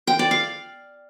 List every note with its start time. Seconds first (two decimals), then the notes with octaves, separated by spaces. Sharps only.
0.07 G5
0.19 D5
0.31 F5